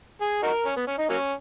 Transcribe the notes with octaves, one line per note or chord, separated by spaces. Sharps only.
G#4
D#4 F#4 A#4
C#4
B3
C#4
D#4
F#3 A#3 C#4